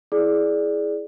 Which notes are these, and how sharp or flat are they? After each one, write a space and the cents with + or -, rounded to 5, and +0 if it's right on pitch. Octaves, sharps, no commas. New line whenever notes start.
E4 +0 G#4 +20 D5 +0